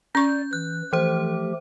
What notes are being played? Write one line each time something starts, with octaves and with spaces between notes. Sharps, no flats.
C#4 D5 C#6 G6
E3 F#6
E3 F3 A3 G4 C5